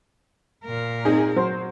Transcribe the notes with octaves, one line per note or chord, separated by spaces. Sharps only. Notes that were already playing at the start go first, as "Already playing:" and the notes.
A#2 A#4
C4 D#4 G#4
F#3 C5